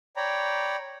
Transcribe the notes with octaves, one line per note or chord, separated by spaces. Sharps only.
C#5 D5 G5 A#5 B5